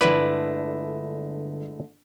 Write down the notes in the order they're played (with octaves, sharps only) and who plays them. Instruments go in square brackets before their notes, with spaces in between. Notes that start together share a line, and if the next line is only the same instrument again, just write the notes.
[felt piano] G1 B6 [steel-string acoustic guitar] D3 G#3 A3 [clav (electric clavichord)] E4 B4 D5